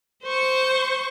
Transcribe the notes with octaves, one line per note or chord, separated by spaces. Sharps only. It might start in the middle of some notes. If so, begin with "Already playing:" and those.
C5 C#6